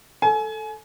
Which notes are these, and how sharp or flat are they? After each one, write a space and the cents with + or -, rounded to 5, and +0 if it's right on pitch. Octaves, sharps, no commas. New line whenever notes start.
A4 +0 G#5 +30